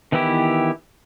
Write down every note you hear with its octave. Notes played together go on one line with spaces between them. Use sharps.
D#3 E3 B3 E4 G4